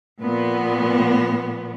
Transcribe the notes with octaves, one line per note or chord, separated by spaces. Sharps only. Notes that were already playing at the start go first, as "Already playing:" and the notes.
A#2 F3 B3